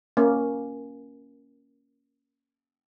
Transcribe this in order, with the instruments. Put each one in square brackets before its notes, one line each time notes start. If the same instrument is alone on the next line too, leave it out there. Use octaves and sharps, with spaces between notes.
[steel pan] A#3 C#4